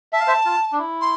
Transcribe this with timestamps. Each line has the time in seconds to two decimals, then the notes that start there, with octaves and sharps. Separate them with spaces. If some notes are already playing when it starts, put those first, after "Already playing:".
0.13 E5 A5
0.20 F5
0.27 C5 E5
0.45 F4
0.72 D4
0.79 E4
1.01 C6